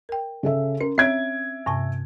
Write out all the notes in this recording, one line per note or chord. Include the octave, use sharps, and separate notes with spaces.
A#4 G5
C#3 A4 E5
C#4 A#4
C4 C#5 E5 G#6 D7
G2 C3 A5